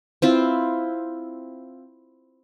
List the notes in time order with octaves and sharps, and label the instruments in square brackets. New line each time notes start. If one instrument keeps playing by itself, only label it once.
[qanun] C4 E4 F4